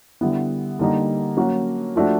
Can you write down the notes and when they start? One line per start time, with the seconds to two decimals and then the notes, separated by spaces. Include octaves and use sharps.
0.21 D3 G3 B3 E4
0.79 D3 G3 A#3 D#4
1.37 F#3 A#3 C#4 F#4
1.96 F3 A3 D4 F#4